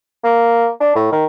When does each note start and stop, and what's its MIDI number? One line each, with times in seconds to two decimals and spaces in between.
0.24 0.68 58
0.80 0.90 62
0.95 1.11 45
1.12 1.25 51